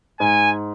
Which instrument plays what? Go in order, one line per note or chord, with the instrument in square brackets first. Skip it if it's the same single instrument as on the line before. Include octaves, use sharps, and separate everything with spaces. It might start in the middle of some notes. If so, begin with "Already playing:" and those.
[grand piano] G#2 [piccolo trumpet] G#5